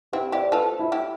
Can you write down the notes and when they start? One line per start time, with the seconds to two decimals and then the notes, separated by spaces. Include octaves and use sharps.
0.13 C4 E4 G4
0.32 E4 G4 D5
0.43 C5
0.52 F4 A4 B4
0.79 E4
0.92 E4 G4